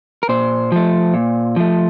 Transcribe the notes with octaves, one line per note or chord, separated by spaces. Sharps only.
A#4
A#2 C5
F3 A3
A#2
F3 A3